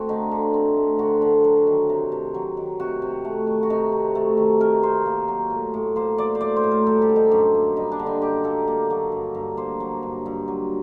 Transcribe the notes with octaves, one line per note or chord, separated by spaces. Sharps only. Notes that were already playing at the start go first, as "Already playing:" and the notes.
Already playing: A3 C4 F#4
D3 D#4
D3
C4
A3
D3 F#4
D3
F#3
D#3
C3
C3
F#3
D#3
C3 F#4
C3
A3
D#3
F#4
C3 D#4
C3
A3 A4
D#3
C3 A#4
C3 C5
A#3
F#3
A2
A2
A#3 C5
F#3 D5
C5
A2 D5
C5
A2
A#4
G3 A4
G4
D3
D#4
F#2
A#3
G3 D#4
D4
D3
D#4
F#2 G4
A#3 A4
A#3
F#3
G2
G2
A#3 C5
F#3
G2
G2
F#3